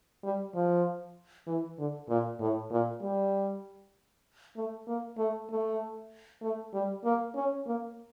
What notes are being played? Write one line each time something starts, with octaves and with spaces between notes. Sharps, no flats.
G3
F3
E3
D3
A#2
A2
A#2
G3
A3
A#3
A3
A3
A3
G3
A#3
C#4
A#3